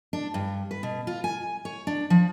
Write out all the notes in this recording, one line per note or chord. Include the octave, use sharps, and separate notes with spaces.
D4
G2
B4
B2
F4
G#5
C#5
D4
F3